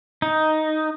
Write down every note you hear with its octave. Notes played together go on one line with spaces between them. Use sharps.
D#4